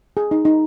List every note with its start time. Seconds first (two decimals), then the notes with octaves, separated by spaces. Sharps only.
0.17 G#4
0.31 D#4
0.45 D#4